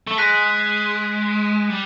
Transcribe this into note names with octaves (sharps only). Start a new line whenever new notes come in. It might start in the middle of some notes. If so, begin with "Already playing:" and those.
A3
G#3 F#6 B6 D#7
G3